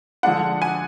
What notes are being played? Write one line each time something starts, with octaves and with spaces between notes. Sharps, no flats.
D3 F3 G#3 D4 F#5
G#5